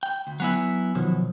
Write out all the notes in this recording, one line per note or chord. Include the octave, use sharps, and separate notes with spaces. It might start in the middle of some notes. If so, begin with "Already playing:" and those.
G5
D2
F#3 B3 E4 F#5 G#5 E6
B2 D#3 F3 F#3